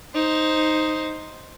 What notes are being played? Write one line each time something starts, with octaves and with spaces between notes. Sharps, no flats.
D#4 C5